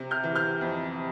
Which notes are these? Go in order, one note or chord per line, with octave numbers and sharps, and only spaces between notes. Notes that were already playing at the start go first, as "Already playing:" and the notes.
Already playing: C3
F6 G6
E3
F6 G6
F2